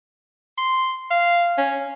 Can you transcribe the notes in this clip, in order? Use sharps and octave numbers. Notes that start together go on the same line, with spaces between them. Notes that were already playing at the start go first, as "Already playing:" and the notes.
C6
F5
C#4